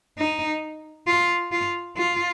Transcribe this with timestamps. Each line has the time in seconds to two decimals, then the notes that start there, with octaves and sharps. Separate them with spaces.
0.19 D#4
1.07 F4
1.52 F4
1.97 F4